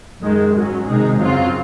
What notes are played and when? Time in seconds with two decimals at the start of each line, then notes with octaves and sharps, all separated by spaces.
0.20 F#2 D#3 G#3
0.53 G#2 F#3 C#4
0.85 C3 D#3 G#3 D#4 G#4
1.18 F#2 C#3 F#3 C4 F4